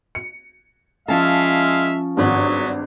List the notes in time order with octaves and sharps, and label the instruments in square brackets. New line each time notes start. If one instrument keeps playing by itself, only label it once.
[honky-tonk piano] C#7
[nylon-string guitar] F3 C#4 A5 [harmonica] G#3 E5 F5
[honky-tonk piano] G#1 G2 [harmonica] F#3 B3